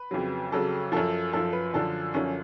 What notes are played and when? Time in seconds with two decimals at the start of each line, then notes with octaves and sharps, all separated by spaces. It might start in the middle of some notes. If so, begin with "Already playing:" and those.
Already playing: B4
0.11 F2 C#3 F#3
0.51 F2 C#3 F#3 A4
0.92 F#2 F3 A4
1.33 F#2 F3 A4
1.53 B4
1.74 F#2 D3 F3 A4
2.14 F#2 D3 F3 C#4